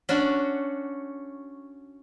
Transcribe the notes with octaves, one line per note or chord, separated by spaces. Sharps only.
C#4 D4 F#4